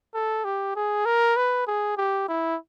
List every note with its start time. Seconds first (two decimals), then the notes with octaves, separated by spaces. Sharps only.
0.14 A4
0.44 G4
0.76 G#4
1.05 A#4
1.36 B4
1.67 G#4
1.97 G4
2.28 E4